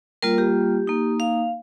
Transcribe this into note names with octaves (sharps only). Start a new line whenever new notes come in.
G3 A#3 F4 A#4
G4
A#3 D#4
F5